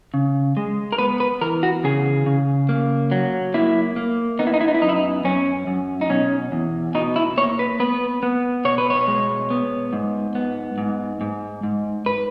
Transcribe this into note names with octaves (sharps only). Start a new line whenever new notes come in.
C#3
G#3
A#4
B3 B4
B4
E3 A#4
F#4
C#3 G#4
C#3
A#3
F#3
A#3 E4
A#3
B3 D#4
E4
D#4
E4
D#4
E4
F#2 D#4
E4
D#4
F#2 C#4
F#2
D#4
B2 C#4
E2
B2 D#4
E4
A#3 C#5
B4
B3 B4
B3
B2 C#5
B4
C#5
G#3
B3
G#2
B3
G#2
G#2
G#2
B4